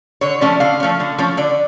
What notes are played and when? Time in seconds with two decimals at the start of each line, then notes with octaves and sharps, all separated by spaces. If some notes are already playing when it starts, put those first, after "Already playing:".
0.21 D3 C#5
0.41 F3 A3 C#4 D5
0.60 D3 F5
0.80 F3 A3 C#4
1.00 D3
1.18 F3 A3 C#4
1.37 D3 D5